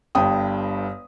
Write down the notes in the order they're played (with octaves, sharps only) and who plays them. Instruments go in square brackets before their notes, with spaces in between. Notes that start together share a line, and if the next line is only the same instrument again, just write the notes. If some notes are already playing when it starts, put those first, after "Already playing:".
[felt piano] G1 G2 G5 D#6